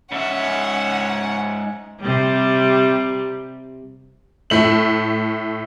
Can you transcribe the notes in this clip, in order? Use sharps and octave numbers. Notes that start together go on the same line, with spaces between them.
G#2 C#4 E5 F#5
C3 G3
A2 A3 F#7